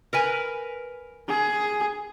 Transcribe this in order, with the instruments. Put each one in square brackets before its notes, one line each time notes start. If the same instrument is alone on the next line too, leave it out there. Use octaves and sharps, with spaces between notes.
[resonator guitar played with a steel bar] A#4 B4 G#5
[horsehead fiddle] G#4